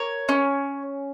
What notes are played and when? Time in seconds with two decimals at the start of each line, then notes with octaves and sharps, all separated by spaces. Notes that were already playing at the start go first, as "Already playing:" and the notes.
Already playing: A#4 C#5
0.29 C#4